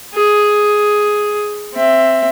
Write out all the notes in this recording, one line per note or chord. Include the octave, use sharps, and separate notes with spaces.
G#4
C4 E5